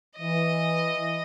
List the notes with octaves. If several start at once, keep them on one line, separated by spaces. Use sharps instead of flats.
E3 D#5